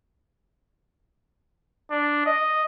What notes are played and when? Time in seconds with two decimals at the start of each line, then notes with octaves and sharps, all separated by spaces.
1.90 D4
2.26 D#5